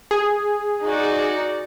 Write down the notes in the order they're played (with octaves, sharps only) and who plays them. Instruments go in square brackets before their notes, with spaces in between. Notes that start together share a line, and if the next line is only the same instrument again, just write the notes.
[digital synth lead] G#4
[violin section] D#4 F#4 D5